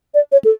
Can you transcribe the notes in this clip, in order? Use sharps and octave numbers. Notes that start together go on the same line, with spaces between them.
D5
C#5
A4